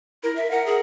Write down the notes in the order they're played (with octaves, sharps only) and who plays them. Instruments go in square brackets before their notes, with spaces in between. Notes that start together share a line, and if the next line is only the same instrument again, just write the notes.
[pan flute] E4 [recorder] A#4
[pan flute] E5
[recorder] A#4 [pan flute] F#5
[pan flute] G#4